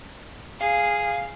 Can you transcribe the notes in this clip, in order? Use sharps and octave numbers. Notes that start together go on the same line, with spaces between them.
G#4 F5